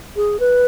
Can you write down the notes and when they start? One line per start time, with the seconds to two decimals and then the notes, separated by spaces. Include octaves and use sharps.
0.16 G#4
0.40 B4